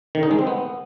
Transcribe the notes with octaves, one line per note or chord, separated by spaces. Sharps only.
D#3
D#4
G#3
C4
B3